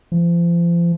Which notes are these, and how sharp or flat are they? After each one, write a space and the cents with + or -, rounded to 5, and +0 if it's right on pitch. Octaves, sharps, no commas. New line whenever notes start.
F3 -35